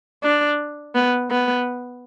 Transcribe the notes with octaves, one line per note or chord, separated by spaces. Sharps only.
D4
B3
B3